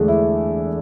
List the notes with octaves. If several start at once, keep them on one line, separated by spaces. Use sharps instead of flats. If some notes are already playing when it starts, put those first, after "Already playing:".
Already playing: E2 D3 G#3 A3 D4 G#4 A4
E4